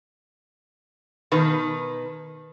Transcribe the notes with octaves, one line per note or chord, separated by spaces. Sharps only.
B2 D#3 B4